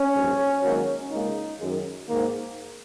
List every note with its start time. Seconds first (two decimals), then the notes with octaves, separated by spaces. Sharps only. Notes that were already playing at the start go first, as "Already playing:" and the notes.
Already playing: C#4
0.14 A#1 G#2 F#3
0.62 G#1 G#2 D#3 F#3 A#3
1.11 C#2 C#3 A#3 D#4
1.60 F#2 D#3 G#3
2.08 G#2 D#3 A#3